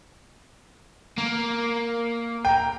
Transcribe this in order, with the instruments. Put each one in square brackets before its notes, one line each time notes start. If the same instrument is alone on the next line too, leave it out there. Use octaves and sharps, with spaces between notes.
[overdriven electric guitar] A#3
[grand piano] G5 A#5